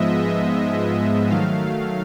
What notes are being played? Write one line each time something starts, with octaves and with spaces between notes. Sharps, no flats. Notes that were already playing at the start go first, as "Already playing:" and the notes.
Already playing: G#2 F3 G#3 B3 D#5 E5
E5
D#5
D#3 F#3 A3 F5